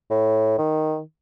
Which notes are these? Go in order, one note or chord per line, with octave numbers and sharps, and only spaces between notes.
A2
D#3